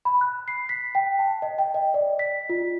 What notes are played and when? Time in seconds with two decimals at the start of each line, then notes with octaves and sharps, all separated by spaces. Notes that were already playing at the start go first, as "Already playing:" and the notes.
0.05 B5
0.21 F#6
0.48 C7
0.69 B6
0.95 G5
1.19 A5
1.42 D#5
1.58 G5
1.74 D#5
1.94 D5
2.19 B6
2.49 F4